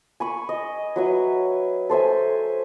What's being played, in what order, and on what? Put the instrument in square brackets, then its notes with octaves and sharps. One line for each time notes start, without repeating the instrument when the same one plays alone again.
[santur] G#5 B5 C#6
D#5
F#3 B4 E5
A4 C5 E5 G#5